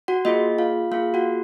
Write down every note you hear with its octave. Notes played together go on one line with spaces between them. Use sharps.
F#4 F#5
A#3 F4 G#4 D#5
F4 F5
A#3 F4 G#4 F5
F#4 F#5